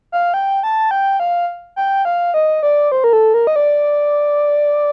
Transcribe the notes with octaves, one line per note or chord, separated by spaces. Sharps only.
F5
G5
A5
G5
F5
G5
F5
D#5
D5
C5
A#4
A4
A#4
D#5
D5